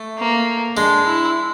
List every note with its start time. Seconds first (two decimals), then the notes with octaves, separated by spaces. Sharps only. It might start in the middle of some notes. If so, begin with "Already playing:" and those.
Already playing: A3
0.18 A#3
0.76 G#3 D4
1.06 E4